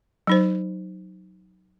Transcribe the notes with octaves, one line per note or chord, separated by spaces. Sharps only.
F#3 D#4 C5